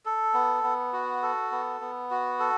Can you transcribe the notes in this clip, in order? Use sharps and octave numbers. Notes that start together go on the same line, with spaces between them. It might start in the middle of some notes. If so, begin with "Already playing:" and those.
A4
B3
B3
F#4
A4
B3
B3
F#4
A4